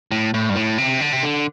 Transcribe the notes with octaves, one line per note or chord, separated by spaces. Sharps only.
A2
A2
G2
A2
C3
D3
C3
D3